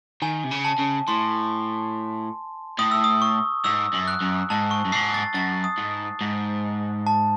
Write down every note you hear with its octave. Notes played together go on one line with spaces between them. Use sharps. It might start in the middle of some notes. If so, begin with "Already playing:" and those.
D#3 G#5
C3
C#3
A5
C#3
A2 C6
A2 D#6
E6
D#6
C#6
G#2 E6
F#2
F#6
F#2
G#2 A5
C#6
F#2
G#2 C7
A6
F#2 A6
D#6
G#2
G#2
A5